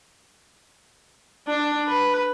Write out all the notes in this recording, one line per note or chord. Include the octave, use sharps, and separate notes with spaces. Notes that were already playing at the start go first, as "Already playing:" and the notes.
D4
B4